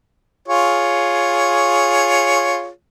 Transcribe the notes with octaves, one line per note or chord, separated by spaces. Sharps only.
F4 G#4 C#5